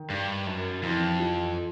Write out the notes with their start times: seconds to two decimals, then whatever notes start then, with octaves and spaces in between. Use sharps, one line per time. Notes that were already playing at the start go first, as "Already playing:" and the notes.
Already playing: D#3
0.10 G2
0.47 F#2
0.83 F2 E3
1.20 F3